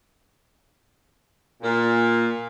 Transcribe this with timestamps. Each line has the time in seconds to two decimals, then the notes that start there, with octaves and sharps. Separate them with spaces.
1.62 A#2